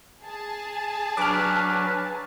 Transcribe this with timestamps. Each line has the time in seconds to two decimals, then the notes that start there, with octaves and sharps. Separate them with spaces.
0.23 G#4 G#5 A5
1.17 F#3 D4 B4 D6 F6